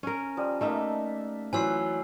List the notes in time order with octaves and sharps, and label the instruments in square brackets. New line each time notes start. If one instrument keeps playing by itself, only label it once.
[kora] C#4 A#4
[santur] F3 G3 D#5
[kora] A3 D#4 [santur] A#3 E5 A5
[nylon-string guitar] E3 F#3 [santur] F4 C5 D5 [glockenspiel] G#5 E6 C7